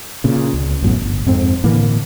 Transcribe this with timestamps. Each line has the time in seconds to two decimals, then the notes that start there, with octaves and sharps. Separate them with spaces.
0.24 A#2 C#3
0.53 C#2
0.82 A1 F#2 A2 B3
0.99 G1
1.26 F2 G#2 C4
1.64 A2 D3 E3 A#3